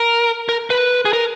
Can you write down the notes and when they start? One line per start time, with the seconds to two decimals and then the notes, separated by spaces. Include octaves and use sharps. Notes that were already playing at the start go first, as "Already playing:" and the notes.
Already playing: A#4
0.49 A#4
0.70 B4
1.05 G#4
1.13 A#4